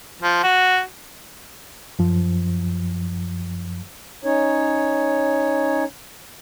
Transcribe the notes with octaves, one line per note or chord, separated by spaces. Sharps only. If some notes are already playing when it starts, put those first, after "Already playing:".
F3
F#4
F#2 F3
C#4 D#4 C#5